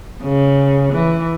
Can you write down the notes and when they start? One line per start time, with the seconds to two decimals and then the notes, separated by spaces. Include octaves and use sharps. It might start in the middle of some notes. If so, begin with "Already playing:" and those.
0.22 C#3
0.92 E3